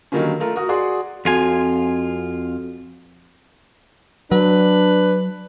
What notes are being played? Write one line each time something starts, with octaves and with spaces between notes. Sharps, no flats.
D3 D#3 F#3 G3 A#3 C#4
A3 F4 A#4
F#4 A#4 D#6
F#4 G#4 D5 F#5 C6
F2 C4 F4 F#4 A4 G#5
F#3 D4 B4